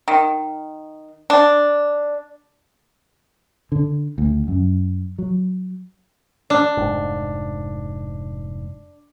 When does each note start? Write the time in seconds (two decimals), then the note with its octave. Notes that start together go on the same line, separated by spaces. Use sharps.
0.08 D#3
1.30 D4
3.72 D3
4.18 D2
4.48 F#2
5.18 F#3
6.50 D4
6.77 F1 G#2